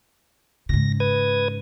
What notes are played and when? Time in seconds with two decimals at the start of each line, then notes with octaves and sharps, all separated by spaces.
0.69 G#2 C#3 A#6
1.00 B4 D#6 G#6